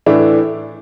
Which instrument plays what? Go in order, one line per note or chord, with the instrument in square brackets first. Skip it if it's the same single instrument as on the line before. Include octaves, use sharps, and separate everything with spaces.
[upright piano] A2 E3 A3 D4